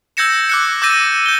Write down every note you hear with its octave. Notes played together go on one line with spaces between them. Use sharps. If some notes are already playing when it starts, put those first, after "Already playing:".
E6 G6 G#6 A#6 C#7 E7
D6 F#6 C#7
F#6
D6 E6 G6 A6 A#6 D#7
G6 G7